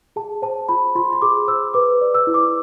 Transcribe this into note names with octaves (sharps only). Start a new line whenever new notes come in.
G#4 A5
C5 A5
F4 B5
F4 C6
C6
G#4 D6
C5 E6
B4 D6
D5
E6
E4
D6